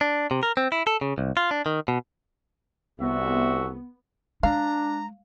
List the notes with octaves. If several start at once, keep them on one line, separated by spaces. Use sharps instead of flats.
D4
C3
A#4
C4
E4
A4
C#3
C2
F4
D4
D#3
B2
C2 B3 F#4 E5
G#3 D4 F5 A#5